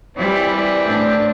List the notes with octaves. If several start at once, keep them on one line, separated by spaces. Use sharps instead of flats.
E3 G3 C4 E4 D5
A2 D4